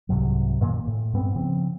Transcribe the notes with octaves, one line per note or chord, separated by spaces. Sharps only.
C2 G#2 C3 F#3
F#2 A#2 D#3 A#3
A2
G2 B3 C4
C#3 F3 C4